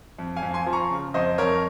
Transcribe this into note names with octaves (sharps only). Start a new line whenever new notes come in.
F2
F5 G#5
F2
G#5 C6
F3
A#5 C#6
C#3
F2 C5 D#5
F2 A#4 C#5